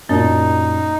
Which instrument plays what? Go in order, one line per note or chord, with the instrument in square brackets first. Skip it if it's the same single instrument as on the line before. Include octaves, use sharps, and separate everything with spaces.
[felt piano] F#2 A#2 [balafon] D4 [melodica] D#4